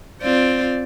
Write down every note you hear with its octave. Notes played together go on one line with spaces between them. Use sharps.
C4 F4 D5